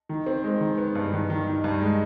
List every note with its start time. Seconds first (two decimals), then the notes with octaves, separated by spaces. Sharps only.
0.09 D#3
0.26 C4
0.44 G#3
0.61 D#3
0.78 B3
0.95 G2
1.13 D#3
1.30 D#3
1.47 D#3
1.64 G2
1.81 G#3